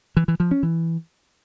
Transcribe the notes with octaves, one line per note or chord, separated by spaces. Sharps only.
E3
E3
F3
C#4
E3